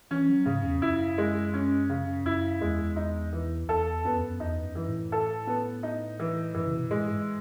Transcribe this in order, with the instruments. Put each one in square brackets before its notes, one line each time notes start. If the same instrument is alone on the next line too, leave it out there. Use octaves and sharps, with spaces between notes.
[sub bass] E3 [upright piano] C#4
[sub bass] F#3
[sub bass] G#2 [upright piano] C#3
[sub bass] E2
[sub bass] F#2 [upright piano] E4
[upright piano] G#3
C#4
C#3
[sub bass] F#2 [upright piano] E4
[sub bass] E2 [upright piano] G#3
[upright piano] D#4
E3
[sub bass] E2 [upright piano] A4
[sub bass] F#2 [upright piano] B3
[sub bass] E2
F#2
[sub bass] E2 [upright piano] D#4
[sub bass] F#2
[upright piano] E3
[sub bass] A2
[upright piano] A4
B3
D#4
E3
[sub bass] F#2 [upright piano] E3
[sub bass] C#3
B2
[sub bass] A2 [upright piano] G#3
[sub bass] G#2